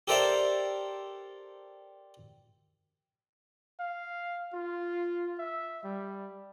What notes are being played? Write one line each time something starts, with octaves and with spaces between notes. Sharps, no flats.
G4 A4 A#4 C5 D5 E5
F5
F4
E5
G3